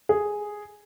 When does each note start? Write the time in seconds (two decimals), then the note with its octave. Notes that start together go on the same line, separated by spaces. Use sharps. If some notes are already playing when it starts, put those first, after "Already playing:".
0.09 G#4